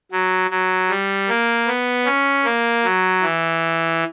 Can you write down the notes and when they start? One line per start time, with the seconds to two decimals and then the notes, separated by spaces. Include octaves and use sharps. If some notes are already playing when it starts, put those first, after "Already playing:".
0.12 F#3
0.50 F#3
0.89 G3
1.28 A#3
1.67 B3
2.05 C#4
2.45 A#3
2.84 F#3
3.22 E3